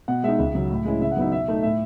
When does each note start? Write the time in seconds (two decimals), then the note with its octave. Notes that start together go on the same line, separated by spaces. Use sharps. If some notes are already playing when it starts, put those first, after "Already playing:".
0.08 B2 F#5
0.23 G#3 D#4 E5
0.39 C#2
0.55 C#3 F#3
0.70 A2
0.85 G#3 C#4 E4
1.00 C#3 E5
1.11 F#5
1.16 F#3 B3 D#4 E5
1.32 B2 E5
1.48 A3 D#4
1.63 A2 E5